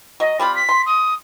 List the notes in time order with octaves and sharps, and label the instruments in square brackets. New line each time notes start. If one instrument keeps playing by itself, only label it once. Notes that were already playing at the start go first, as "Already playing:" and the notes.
[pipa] F#3 [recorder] D#5
[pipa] G3 C4 F4 [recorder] B5
[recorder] B6
[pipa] C6
[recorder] D#6